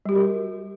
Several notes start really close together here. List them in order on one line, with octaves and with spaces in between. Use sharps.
G3 G4 F#4 A#4